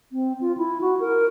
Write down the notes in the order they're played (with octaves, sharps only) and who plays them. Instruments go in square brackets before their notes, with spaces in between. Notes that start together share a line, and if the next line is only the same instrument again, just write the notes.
[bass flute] C4
F4
E4
F#4
A#4